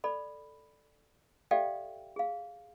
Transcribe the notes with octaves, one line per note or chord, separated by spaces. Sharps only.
A4 D5 B5
G4 A4 D5 E5 F5 G5
G#4 F5